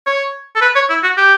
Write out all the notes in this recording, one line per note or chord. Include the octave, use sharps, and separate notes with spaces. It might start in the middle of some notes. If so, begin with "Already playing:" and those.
C#5
A4
B4
C#5
E4
F#4
G4